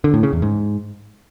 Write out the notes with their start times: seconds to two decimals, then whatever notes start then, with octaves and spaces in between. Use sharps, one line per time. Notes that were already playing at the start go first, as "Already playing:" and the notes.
0.04 D3
0.14 A2
0.23 C#3
0.33 E2
0.42 G#2